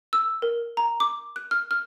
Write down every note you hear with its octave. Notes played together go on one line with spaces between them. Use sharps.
E6
A#4
A#5
D6
F#6
F6
F6